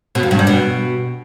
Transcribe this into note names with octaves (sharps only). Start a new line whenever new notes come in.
B2
F2
G2
G3
B2